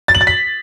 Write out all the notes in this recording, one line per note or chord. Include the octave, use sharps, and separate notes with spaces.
A6
F#7
A6
B6